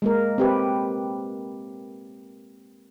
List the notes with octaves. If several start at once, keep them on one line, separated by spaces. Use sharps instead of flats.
G#3 A#3 A#4
C4 G4 B4